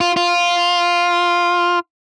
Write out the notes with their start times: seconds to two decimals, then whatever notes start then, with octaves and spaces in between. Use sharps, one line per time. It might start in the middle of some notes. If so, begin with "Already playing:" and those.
0.01 F4
0.17 F4